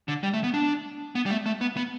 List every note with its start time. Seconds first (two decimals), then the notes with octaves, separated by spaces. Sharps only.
0.08 D3
0.23 G3
0.33 A3
0.44 B3
0.54 D4
1.15 B3
1.26 G3
1.31 A3
1.46 A3
1.61 B3
1.77 B3